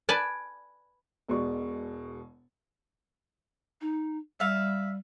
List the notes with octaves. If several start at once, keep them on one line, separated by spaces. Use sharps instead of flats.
B4 D5 G#5 A5
E1 B2 G#3 D5 C#6
D#4
G3 E5 F5